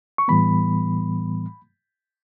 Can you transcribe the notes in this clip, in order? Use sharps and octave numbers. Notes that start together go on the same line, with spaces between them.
C#6
A2 E3 G3 B3 B5